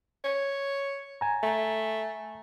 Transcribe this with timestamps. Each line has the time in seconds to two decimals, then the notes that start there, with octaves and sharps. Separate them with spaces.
0.24 C#5
1.21 G#5 A#5
1.43 A3